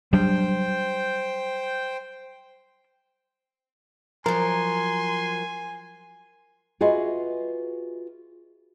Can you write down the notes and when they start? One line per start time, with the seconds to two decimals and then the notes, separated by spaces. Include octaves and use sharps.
0.13 F#3 G3 D4 C5 G5
4.26 F3 F#3 A#4 G#5 C6
6.81 F4 F#4 G#4 B4 D#5 E5